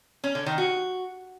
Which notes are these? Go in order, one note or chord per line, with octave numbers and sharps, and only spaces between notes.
C#4
D3
D#3
F#4